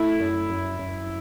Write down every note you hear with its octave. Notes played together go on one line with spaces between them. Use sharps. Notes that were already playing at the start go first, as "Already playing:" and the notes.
Already playing: A3 E4
F#2
F#2
F#2